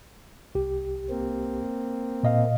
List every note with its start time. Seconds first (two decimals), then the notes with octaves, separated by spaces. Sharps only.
0.55 C2 G4
1.10 A#3 C4
2.23 A#2 D#5 F5